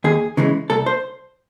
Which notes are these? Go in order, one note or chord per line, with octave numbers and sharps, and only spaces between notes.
D#2 G#4
C#3 E3 G#3
C2 A4
C5